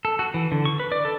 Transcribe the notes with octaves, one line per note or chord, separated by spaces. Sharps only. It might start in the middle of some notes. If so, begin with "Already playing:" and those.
A4
F#4
E3
D3
C#6
B4
D5
A4